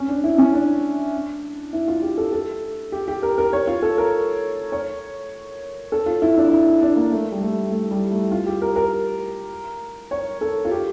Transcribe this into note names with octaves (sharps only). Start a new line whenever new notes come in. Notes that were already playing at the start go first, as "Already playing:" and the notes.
Already playing: C#4
D4
E4
C#4
D4
E4
F4
G4
A4
A4
G4
G4
A#4
A#4
C#5
F4
A4
A#4
C#5
A4
F4
E4
D4
E4
E4
D4
A#3
A3
G3
A3
A3
G3
A3
F4
G4
A#4
A#4
C#5
A4
F4
G4